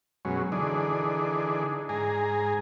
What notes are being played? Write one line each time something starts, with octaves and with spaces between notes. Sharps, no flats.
F#2 B2 F#3 G#3 C#4
D3 E3 D4 D#4 G#4
G#2 G#4 G#5 A#5